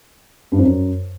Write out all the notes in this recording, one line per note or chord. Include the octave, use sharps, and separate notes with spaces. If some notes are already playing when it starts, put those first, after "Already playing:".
G2
F2
F#2